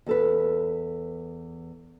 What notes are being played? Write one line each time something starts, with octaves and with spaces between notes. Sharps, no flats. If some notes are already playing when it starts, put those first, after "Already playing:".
E2 A4 B4